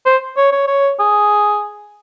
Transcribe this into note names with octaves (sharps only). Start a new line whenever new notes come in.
C5
C#5
C#5
C#5
G#4